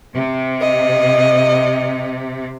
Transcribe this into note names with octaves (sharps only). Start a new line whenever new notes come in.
C3
D#5